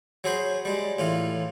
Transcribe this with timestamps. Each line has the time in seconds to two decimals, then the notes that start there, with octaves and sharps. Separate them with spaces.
0.24 F#3 G#4 C5 B5
0.65 G3 G#3
0.99 A2 E3 F4